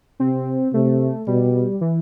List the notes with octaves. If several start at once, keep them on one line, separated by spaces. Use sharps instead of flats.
C3 C4
C3 A3
B2 G3
E3